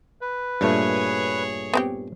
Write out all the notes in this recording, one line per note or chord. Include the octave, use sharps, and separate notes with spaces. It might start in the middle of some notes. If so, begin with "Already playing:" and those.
B4
G2 A#2 A3 G#4 C#5
B3 C4 G4